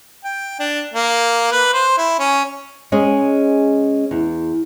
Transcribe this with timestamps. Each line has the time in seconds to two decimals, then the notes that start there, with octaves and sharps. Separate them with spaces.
0.24 G5
0.59 D4
0.94 A#3
1.52 B4
1.73 C5
1.98 E4
2.19 C#4
2.92 G#3 C#4 G#4 D#5
4.11 E2